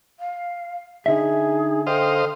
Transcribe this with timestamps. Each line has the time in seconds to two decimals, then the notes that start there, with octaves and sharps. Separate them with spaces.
0.20 F5
1.06 D3 D#4 G#4 E5
1.87 A4 C5 D#5 F5 G5